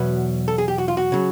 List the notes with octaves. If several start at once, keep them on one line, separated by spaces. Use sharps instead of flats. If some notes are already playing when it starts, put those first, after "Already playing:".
Already playing: E2 B2 F#3 B4
A4
G#4
G4
F#4
F4
F#4
C#3 F#3